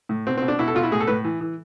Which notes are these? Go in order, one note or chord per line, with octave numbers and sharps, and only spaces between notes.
A2
B2 C4
B2 C4
D4
B2 E4
A4
B2 F4
E4
A2 G#4
A4
A2 B4
E3
E3